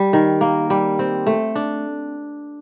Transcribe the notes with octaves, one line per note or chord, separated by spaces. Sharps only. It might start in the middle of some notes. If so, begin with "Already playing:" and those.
Already playing: G3
D#3
A#3
G3
C4
A3
D4